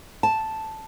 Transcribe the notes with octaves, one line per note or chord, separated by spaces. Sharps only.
A5